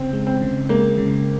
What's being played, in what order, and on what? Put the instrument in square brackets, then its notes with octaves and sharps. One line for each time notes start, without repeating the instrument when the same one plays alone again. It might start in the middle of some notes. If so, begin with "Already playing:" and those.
Already playing: [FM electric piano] C#3 [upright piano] C4
[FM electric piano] G#3
[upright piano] C4
[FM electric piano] C#3
[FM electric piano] G#3 [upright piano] A#3
[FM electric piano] C#3